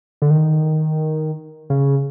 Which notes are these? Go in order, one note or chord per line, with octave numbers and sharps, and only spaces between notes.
D3
D#3
C#3